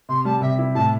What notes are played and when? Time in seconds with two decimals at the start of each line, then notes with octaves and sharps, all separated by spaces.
0.09 C3 C6
0.25 G3 A5
0.41 C3 E5
0.59 E4
0.75 A2 A5